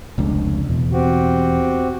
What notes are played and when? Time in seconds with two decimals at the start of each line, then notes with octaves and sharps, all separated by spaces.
0.18 F1 C#2 D4
0.69 E2 B2
0.93 C4 F#4 G4